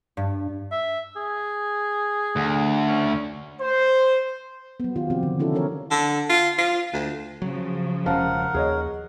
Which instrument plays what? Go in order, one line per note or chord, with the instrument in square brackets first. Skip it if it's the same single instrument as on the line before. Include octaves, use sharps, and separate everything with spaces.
[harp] G2
[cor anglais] E5
G#4
[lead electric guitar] D2
[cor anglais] C#4
[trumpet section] C5
[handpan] F#3 B3
D#3 B3 F4 G4
C3 F3 C4 G4
D3
C#4 D4 E4 F#4 A4
E3 G3 C4 E4 A#4 C#5
[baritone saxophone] D3
F4
F4
D2
[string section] C#3 F3 [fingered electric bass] F#3
[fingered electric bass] E1 C#4 [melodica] A#4 F#5 [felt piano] C5 F5 A5
[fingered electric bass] D#2 [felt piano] G#4 C#5 D#5